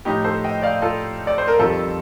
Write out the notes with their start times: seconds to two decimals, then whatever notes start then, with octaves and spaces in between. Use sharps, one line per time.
0.05 A2 F3 D#4 G4
0.24 A4 C5
0.44 D#5 G5
0.62 D5 F5
0.82 F4 A4
1.27 D5
1.38 C5
1.48 A#4
1.59 F2 D#3 G3 F4 A4